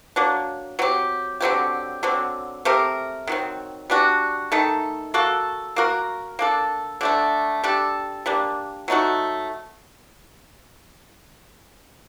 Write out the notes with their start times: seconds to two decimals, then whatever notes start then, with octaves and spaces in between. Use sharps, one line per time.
0.16 F#3 A#3 D4
0.79 F#3 C4 G4
1.40 D3 F#3 C4 G4
2.03 D3 F#3 C4
2.65 A3 C4 G4 A#4
3.27 D#3 F#3 C4
3.90 G3 D4 F#4
4.52 D#3 A3 D#4 A4
5.14 A#3 F#4 A4
5.76 A#3 F#4 A#4
6.39 A#3 D4 A4
7.01 D3 A3 D4
7.64 G3 D4 A4
8.26 G3 A#3 D4
8.88 F#3 A3 D#4 F#4